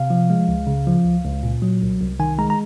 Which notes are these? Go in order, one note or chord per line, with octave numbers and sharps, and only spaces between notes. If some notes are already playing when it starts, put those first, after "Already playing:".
Already playing: C3 F5
F3
G#3
C#2
C#3
F3
C#2
C#2
A#2
F#3
C2
C2
D#3 G#5
G#3 A#5
A#5